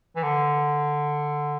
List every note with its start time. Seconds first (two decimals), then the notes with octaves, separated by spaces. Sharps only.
0.16 E3
0.23 D3